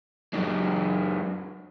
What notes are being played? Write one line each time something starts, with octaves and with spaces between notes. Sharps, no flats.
F#2 G#3